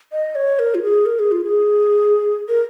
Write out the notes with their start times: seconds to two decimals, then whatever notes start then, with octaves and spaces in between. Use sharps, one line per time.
0.12 D#5
0.35 C#5
0.59 A#4
0.75 F4
0.82 G#4
1.06 A#4
1.19 G#4
1.32 F4
1.44 G#4
2.49 A#4